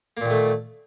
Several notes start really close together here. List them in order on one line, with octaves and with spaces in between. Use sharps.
A#3 A#2 D#3 A3